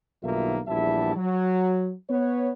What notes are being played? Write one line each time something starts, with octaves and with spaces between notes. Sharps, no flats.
B1 G2 D#3 A#3 F4 E5
A#1 E2 G3 E4 E5 A5
F#3
B3 B4 C#5